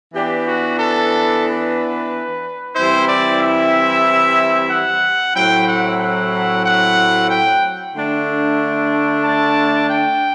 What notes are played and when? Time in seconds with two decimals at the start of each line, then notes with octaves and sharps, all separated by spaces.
0.14 E3 B3 D4 G4
0.46 F#4
0.79 A4
1.44 B4
2.74 E3 G3 C4 E4 C5
3.07 D5
3.39 E5
4.69 F#5
5.34 A2 F#3 C4 E4 G5
5.67 F#5
5.99 F#5
6.65 F#5
7.29 G5
7.94 D3 A3 D4
9.24 A5
9.89 G5